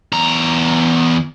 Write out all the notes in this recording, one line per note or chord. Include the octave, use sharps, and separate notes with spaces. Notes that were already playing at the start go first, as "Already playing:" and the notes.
E2 A#5